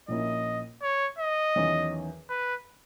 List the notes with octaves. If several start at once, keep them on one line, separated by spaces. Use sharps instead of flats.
A#1 A#2 A#3 C#4 E4 D#5
C#5
D#5
E2 D#3 F#3 C#4
B4